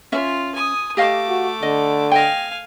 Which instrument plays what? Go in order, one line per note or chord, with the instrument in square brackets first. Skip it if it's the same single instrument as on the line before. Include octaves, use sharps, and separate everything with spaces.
[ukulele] C#4 E5 [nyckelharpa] F4
[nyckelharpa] G#5 D#6
[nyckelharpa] A3 D6 [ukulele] G4 D#5 F5
[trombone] F#4
[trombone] D3 [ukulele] D#5
[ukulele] D#5 G5 [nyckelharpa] F5 G#5